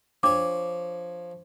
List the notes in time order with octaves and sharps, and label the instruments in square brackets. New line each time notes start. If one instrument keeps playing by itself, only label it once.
[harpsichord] F3 C#5 [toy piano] D4 D6